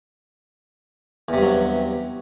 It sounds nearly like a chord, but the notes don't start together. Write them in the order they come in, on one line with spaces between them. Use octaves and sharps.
E2 C3 G2 F#3